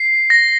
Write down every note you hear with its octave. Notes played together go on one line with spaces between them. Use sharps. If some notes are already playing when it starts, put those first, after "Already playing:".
Already playing: C7
A#6